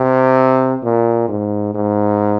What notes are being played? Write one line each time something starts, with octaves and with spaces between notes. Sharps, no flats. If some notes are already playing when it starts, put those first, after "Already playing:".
Already playing: C3
A#2
G#2
G#2